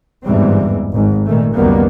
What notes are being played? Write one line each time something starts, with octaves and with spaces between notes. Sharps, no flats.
G1 E2 G#2 E3 G3 C4
G#1 G#2
A#2 D#3 A3
C#2 F#2 D#3 G3 A#3 B3